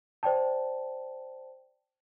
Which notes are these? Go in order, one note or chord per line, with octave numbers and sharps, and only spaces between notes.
C5 D5 G5 A5